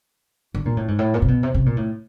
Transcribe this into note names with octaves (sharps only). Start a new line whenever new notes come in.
D3
A#2
A2
G#2
A2
A#2
C3
B2
C3
C3
A#2
A2